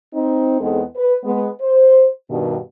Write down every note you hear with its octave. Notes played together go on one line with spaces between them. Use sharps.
C4 D#4
E2 G#3 B3 C4 D#4 A4
B4
G#3 B3
C5
G2 B2 D#3